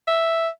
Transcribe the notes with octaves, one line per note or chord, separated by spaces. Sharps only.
E5